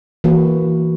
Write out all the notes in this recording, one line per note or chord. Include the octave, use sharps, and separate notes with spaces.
E3 A#3 F#4 B4